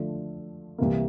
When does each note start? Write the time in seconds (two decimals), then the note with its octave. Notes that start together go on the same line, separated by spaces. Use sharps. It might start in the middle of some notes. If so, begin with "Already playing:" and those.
Already playing: D3 F3 A3
0.78 C2 C3 E3 A#3